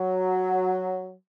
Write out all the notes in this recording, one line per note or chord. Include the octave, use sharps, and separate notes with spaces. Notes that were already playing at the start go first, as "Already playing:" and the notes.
Already playing: F#3